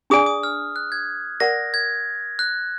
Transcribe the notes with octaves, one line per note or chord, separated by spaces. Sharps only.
D4 G#4 D5 G#5 D#6
D#6
F6
F#6
G#6
A#4 D5 F#5 A#6
G#6
F#6